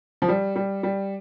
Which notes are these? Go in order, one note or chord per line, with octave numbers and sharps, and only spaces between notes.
F3
G3
G3
G3